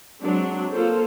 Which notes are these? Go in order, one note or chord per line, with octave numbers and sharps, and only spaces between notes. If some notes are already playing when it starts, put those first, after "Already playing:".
F#3 G#3 C4 D4
A#3 F4 A4 C5